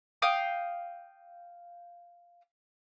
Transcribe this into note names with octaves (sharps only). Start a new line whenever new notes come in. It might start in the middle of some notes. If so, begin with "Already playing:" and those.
F5 G5 D#6